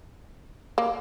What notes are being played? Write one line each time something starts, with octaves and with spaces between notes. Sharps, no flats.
A#3